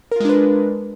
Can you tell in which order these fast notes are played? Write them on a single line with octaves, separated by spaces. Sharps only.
A#4 F4 G#3 D4 B4